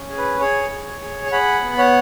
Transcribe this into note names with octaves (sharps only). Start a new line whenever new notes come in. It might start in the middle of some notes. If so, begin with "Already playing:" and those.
Already playing: C#4
G#4
B4
G#4 C#5
G#4
G#4
C#6
G#4 F#5 B5
B3
C#5 F#5